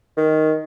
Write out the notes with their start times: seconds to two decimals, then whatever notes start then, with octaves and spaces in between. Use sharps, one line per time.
0.17 D#3